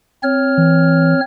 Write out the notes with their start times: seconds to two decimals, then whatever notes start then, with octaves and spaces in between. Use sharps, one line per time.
0.23 C4 C#5 F6
0.58 E3